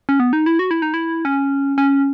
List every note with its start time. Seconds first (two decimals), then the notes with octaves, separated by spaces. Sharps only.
0.09 C#4
0.20 B3
0.33 D#4
0.46 E4
0.59 F#4
0.71 E4
0.82 D#4
0.94 E4
1.25 C#4
1.78 C#4